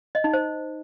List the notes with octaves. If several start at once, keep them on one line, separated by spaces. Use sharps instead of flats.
D#5
D#4
C5